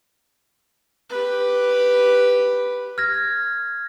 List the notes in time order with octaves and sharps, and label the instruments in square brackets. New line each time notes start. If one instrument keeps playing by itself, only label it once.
[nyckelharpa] G4 B4
[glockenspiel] F6 G#6 A#6